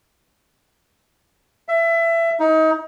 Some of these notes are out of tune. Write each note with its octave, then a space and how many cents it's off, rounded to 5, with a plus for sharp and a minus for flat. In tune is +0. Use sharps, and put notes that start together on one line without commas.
E5 +20
D#4 +30